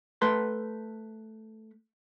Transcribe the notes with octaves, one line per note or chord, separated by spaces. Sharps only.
A3 B4 C6